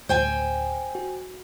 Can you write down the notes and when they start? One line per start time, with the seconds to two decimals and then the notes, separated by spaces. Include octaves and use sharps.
0.09 D2 A2 C5 G5 G#5
0.95 F#4